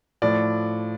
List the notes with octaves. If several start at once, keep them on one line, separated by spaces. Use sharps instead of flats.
A2 F3 D5